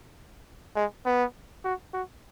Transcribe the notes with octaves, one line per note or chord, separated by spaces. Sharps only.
G#3
B3
F#4
F#4